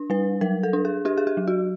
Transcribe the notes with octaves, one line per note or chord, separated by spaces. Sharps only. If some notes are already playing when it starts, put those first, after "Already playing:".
Already playing: D4
G3 B4
F#3 A#4
A4
D4
G#4
D4 G4
G#4
G4
F#3
F#4